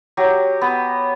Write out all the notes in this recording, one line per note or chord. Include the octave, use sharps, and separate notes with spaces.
F#3 G4
B3